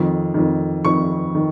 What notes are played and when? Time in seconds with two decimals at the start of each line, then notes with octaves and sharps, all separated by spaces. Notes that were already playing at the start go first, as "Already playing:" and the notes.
Already playing: F2 D#3
0.34 F2 D#3
0.85 F2 D#3 C#6
1.35 D#3